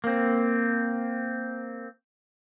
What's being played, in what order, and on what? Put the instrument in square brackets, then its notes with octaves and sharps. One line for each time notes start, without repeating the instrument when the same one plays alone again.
[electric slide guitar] A#3 C4